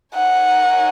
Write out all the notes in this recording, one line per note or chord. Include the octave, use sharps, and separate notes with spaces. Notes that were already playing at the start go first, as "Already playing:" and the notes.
D#4 A#4 C#5 F#5 G#5